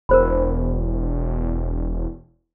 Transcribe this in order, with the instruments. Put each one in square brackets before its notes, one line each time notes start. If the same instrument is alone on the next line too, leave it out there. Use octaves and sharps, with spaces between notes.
[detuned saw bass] E1 [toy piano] A#4 C5 B5